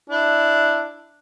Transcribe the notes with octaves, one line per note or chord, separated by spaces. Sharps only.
D4 E4